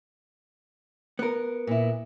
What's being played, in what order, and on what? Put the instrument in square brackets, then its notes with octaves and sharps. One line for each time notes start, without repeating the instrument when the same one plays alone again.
[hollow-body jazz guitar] B3 A#4
[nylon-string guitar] A#2 E4